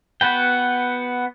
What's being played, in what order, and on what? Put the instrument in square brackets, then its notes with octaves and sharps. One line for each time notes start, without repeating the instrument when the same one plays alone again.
[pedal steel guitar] B3 F#4 B4 G5